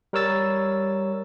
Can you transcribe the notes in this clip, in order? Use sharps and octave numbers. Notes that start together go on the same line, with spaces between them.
G3 A#4 C#5 E6 A6